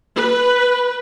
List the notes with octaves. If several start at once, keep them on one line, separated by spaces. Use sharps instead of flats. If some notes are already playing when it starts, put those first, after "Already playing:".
B4